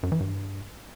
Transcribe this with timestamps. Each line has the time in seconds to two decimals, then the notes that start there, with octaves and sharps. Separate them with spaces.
0.03 F#2
0.12 E3
0.20 G2